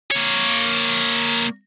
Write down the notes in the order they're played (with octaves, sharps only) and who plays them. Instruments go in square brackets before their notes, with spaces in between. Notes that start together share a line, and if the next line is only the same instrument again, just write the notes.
[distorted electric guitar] A#3 C#5